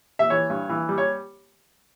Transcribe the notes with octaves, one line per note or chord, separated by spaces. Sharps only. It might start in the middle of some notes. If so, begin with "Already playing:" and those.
E5
E3 C#5
G2
E3
G3
C#5